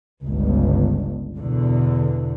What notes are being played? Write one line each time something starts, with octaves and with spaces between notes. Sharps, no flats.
G1 C#2
E2 B2 D3